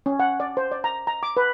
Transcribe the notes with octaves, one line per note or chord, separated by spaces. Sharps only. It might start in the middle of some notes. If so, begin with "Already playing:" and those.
C#4
F#5
D5
C5
D5
A#5
A#5
D6
B4